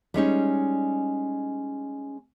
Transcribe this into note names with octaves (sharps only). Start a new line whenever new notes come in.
G3 G#3 C#4 D#4